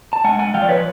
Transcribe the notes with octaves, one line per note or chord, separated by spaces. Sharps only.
A5
G#3 F#5 G#5
F#5 G#5
F3 F5 G5
D5
B4 C#5